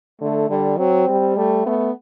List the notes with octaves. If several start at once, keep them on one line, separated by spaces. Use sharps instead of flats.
D3 A3
D3 G3
F#3 C4
G3
G3 A3
A3 B3